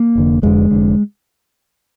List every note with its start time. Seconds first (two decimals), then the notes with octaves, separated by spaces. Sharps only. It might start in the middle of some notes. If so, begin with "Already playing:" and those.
Already playing: A#3
0.15 F1 F2 D3
0.42 F1 F2 D3 G#3
0.71 F1 F2 D3